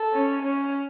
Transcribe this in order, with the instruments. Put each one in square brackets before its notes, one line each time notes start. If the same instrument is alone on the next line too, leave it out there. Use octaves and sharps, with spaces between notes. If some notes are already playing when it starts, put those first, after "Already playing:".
Already playing: [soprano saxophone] A4
[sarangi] C#4
C#4